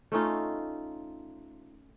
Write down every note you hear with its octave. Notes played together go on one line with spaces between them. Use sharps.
A3 C#4 D#4 F4